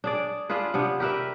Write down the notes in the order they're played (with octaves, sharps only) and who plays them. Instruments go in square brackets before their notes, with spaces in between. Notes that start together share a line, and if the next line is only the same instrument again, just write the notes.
[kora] D4 G#4 D5
D4 F4 G#4 B4
C3 B3 D4
G4 A#4 B4 E5